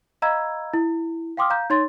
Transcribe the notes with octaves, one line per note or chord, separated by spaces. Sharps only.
D#5 F5 A#5 B5 E6 G#6
E4
F5 G5 C6 D6 D#6 F6
F5 A#5 G6
D#4 C#5 C6 A6